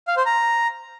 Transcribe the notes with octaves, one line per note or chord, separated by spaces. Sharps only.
F5
C5
A#5